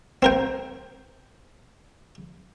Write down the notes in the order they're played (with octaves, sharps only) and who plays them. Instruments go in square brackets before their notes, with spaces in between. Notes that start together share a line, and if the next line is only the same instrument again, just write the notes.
[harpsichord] C4 A#4 G5